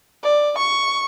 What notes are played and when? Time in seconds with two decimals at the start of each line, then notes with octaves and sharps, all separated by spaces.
0.24 D5
0.58 C#6